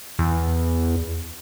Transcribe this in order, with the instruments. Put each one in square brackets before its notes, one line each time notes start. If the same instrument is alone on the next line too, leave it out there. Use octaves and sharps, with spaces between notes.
[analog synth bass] E2